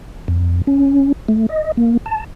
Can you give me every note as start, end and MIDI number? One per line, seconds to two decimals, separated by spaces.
0.28 0.62 41
0.67 1.12 61
1.28 1.46 57
1.49 1.72 75
1.77 1.97 58
2.06 2.25 81